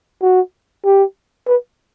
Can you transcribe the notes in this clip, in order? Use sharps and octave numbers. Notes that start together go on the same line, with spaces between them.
F#4
G4
B4